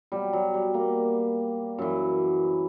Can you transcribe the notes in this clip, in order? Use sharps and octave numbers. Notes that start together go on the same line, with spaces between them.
B2 F#3 G3
F#3
G3
A#3
F#2 E3